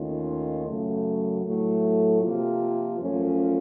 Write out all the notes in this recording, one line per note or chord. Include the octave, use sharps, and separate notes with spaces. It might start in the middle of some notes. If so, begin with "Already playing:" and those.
Already playing: D#2 D#3 A3 C#4 F4
F#2 C#3 F#3 A3
A2 F#3 A3
C3 F3 A#3 F4
F#2 F3 A3 C#4 F4